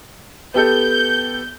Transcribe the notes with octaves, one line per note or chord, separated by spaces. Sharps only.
B3 G4 A4 G6